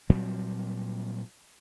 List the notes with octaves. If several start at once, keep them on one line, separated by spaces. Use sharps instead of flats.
A#2 F#3 G3 C4